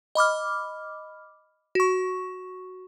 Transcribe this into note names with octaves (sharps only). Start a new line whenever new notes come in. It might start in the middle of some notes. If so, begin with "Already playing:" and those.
D#5 B5 D6 F6
F#4 C#6